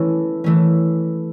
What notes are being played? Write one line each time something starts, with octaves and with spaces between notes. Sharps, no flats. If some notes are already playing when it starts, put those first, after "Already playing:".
Already playing: E3 A3 C#4
E3 A3 C#4